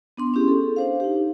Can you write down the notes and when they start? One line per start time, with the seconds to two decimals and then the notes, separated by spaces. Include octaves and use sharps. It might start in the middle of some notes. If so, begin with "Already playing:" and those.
0.17 B3 D4 C6
0.34 C#4 E4 G4 G#4
0.48 A4
0.76 D4 C5 F5
1.00 D#4 G4